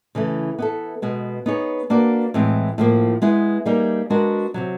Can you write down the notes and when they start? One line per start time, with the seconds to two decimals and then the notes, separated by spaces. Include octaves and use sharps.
0.15 C#3 E3 A3
0.59 B3 E4 A4
1.02 B2 G#3 B3
1.46 B3 D#4 G#4 C#5
1.90 A#3 D4 F#4 B4 D5
2.34 A2 E3 G#3 C4
2.78 A2 F3 A#3
3.22 G#3 B3 E4 G#4
3.65 G3 A#3 D#4 G#4
4.10 G#3 B3 D4 F#4 A#4
4.54 C3 D#3 F#3